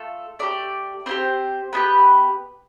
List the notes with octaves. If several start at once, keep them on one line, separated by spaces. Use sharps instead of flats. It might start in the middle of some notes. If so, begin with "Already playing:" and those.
Already playing: A3 F4 A4
A3 D4 G4 D5
C4 E4 G4 C5
B3 D4 G4 B4